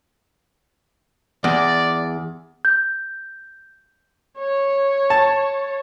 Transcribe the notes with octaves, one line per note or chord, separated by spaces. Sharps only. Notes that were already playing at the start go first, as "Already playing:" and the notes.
E2 D5
G6
C#5
A5